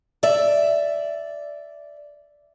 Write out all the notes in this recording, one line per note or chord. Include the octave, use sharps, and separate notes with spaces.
D5 E5